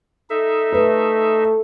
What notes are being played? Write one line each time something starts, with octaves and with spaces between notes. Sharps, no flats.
D#4 A4 E5
A3 B4